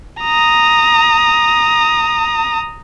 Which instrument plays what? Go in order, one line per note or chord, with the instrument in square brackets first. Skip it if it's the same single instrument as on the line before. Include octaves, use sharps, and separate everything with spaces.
[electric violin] A#5 D#6